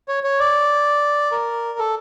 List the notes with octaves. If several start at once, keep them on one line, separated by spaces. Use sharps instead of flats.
C#5
C#5
D5
A#4
A4